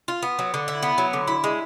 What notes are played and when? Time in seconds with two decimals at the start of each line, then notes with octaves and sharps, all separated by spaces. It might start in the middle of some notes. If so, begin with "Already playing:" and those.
0.08 F4
0.23 B3
0.39 F#3
0.54 D3
0.68 E4
0.83 B3
0.98 F#3
1.13 D3
1.28 E4
1.44 G#3